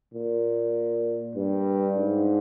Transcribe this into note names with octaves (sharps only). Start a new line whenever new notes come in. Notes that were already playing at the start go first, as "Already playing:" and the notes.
A#2
G2
G#2